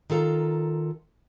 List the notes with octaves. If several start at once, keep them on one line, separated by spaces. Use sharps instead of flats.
D#3 F4 A4 A#5